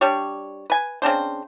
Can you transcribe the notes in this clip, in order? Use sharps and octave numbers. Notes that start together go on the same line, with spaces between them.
G3 D4 G4 C#5
B4 G#5
C#3 C4 D4 C5